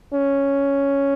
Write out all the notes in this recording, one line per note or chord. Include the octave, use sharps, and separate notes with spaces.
C#4